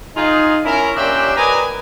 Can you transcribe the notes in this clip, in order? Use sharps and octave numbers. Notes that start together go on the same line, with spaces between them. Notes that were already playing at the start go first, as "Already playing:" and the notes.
D#4 F4 G#4
C#4 E4 A#4
A#2 C#4 D4 G4 E5 G5
A#4 B4 D5 D#5 G#5 A#5